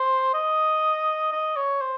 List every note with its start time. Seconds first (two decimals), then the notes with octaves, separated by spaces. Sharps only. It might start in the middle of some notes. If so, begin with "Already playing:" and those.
Already playing: C5
0.34 D#5
1.33 D#5
1.57 C#5
1.81 C5